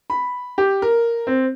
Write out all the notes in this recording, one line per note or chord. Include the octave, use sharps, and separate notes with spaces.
B5
G4
A#4
C4